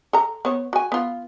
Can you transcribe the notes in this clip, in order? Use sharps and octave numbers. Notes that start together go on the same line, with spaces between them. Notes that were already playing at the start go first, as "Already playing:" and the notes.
A4 A#5
B3 C#5
F#4 G#5
B3 F4